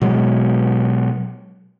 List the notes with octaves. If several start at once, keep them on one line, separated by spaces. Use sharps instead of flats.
B2 F#3 G#3